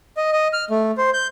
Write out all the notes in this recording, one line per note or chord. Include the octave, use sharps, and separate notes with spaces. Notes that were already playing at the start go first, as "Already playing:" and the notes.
D#5
D#5
F6
A3
C5
G6